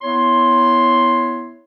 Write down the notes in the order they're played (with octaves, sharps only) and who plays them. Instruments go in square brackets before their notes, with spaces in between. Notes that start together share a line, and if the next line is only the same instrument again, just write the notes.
[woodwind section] B3 E4 C#5 C6